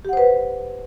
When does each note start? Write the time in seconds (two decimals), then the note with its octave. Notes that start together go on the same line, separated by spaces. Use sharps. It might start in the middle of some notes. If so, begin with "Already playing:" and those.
0.05 G4
0.09 F#5
0.13 C5
0.17 B4